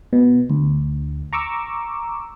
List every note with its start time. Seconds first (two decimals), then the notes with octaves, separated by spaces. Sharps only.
0.13 B2
0.50 D2
1.33 A#5 C#6 D6 E6